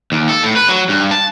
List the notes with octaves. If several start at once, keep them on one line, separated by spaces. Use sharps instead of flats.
D#2
A4
A2
B4
F#3
G2
A5